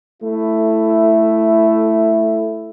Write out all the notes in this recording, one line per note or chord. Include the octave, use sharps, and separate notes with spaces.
A3 E4